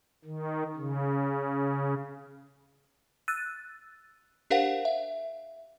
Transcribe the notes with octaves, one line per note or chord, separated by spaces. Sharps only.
D#3
C#3
E6 F#6 A6 D#7
D4 G4 A#4 C5 F5 F#5
E5